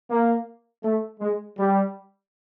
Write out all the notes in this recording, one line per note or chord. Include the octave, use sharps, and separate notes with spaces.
A#3
A3
G#3
G3